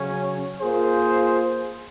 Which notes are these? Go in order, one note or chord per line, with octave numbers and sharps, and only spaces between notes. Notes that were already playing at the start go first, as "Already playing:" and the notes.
Already playing: C#3 F#3 C#4
A#3 F4 G#4 C5